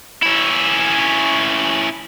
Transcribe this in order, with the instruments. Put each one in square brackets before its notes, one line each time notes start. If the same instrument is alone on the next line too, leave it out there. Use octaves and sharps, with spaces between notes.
[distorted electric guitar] C#4 E4